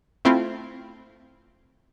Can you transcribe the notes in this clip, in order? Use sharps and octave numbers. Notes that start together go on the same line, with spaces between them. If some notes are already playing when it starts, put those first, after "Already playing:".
A3 C4 E4 F4